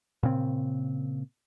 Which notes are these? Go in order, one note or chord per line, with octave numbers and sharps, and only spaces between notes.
A#2 C#3 C4